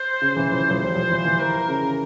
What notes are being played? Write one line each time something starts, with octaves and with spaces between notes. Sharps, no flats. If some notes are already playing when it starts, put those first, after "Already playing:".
Already playing: C5
C#3
E3
F3 C5
F3
G3 C5
F3
E3
E3
A#4
C#3